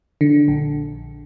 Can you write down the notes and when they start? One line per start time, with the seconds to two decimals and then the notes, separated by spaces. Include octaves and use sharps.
0.21 D3
0.48 A#1